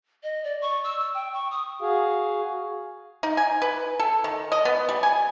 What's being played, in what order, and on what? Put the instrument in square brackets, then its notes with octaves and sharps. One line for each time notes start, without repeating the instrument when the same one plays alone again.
[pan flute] D#5
D5
C#6
E6
E6
G5
C#6
D#6
[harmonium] F#4 G#4 F5
[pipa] D#4
G#5
B4
A4
D#3
D#5
B3
G3
G#5